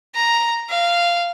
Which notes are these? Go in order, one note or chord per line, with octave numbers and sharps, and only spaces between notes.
A#5
F5